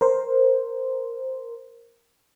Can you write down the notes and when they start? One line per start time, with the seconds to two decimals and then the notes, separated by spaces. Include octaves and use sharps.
0.01 A#4 C5